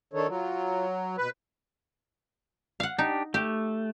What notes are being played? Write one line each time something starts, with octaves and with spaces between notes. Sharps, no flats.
D#3 D4 A4 C#5
F#3 F4
B2 B4
F5 F#5
D4 D#4 G4
A3 G4